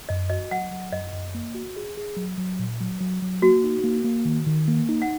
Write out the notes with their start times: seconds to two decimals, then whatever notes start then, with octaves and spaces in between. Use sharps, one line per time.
0.09 F#2 D#5
0.29 F#4 D#5
0.51 F#3 F#5
0.71 F#3
0.92 F#2 D#5
1.13 F#2
1.35 A#3
1.55 F#4
1.76 G#4
1.97 G#4
2.17 F#3
2.38 F#3
2.59 A#2
2.80 F#3
3.01 F#3
3.22 F#3
3.42 A#3 F#4
3.64 D#4
3.84 A#3
4.04 A#3
4.25 D#3
4.46 D#3
4.68 A#3
4.89 D#4
5.02 F#5